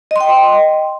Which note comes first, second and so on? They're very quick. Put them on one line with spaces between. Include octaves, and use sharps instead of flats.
D#5 C6 G5